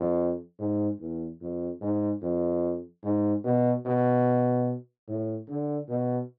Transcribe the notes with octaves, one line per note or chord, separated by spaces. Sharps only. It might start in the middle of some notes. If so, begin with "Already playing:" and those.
Already playing: F2
G#2
E2
F2
G#2
F2
G#2
B2
B2
A2
D3
B2